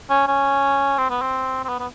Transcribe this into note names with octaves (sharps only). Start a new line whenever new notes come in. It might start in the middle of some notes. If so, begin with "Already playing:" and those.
C#4
C#4
C4
B3
C4
C4
B3
B3